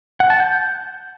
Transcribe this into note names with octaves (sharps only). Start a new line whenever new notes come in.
F#5
A5
G6